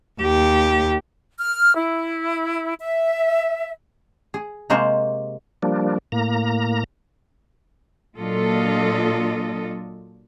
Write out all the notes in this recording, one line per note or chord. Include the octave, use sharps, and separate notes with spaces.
D#2 G4
F6
E4
E5
G#4
C3 G#3 A#3 F#4 C5
F3 G3 A#3 D4
A2 A#3 A#5
A#2 F#3 D4 F4 A4 D#5